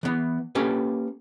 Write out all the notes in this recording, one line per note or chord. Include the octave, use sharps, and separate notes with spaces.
E3 B3
A#3 C#4 G4 A4 B4